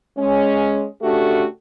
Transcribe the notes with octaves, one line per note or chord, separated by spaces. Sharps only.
G#3 C#4
C#3 A3 D4 F#4 G4 A4